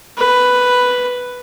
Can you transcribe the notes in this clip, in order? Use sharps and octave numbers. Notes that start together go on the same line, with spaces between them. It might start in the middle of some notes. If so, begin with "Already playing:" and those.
B4